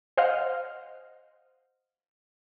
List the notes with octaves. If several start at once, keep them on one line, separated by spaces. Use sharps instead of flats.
C5 D#5 F5 F#5 F6